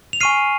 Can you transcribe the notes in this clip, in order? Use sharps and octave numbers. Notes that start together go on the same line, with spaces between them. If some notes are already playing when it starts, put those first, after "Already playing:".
F7
G#5 C#6 F6 C7 D#7